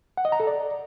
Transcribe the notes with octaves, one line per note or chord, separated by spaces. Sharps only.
F#5
D#5
A#5
A4
D5